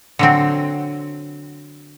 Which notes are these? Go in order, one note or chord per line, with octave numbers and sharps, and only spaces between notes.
D3 F#3 C4